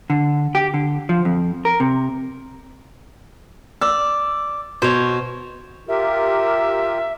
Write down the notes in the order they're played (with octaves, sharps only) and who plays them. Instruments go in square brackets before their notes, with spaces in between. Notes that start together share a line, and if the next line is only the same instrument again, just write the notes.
[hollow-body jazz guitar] D3
G4
D3
F3
F2
A#4
C3
[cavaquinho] D5 [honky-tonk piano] E6
[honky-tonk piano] B2 [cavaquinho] C5 C#5
[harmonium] F4 G4 A#4 [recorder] E5